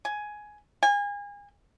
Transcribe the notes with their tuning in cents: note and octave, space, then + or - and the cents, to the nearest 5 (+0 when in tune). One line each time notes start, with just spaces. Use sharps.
G#5 +10
G#5 -35